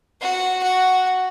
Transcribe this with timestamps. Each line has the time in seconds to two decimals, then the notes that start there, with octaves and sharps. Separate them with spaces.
0.21 F#4
0.63 F#4